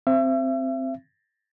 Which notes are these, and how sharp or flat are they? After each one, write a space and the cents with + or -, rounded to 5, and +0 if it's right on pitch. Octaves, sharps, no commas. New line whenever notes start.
C4 +0 E5 +35